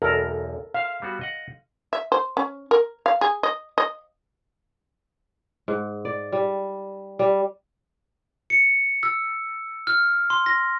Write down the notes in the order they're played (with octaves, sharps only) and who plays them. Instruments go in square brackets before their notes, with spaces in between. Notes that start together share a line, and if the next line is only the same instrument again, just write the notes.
[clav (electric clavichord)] B1 E2 [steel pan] A4 A#4
[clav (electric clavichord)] E5 [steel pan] F5
[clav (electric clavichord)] G3 B3 F#4
D#5 F#5
[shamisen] E5
C5
C#4
A#4
F5
G#4
D#5
D#5
[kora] G#2
D5
G3
G3
[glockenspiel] C#7
E6
F6
C6
A#6